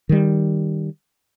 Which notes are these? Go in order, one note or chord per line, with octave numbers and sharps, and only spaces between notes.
D#3 G3